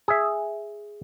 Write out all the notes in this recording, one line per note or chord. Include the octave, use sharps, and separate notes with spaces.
G#4 E5